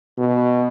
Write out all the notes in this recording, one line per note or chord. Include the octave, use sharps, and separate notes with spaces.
B2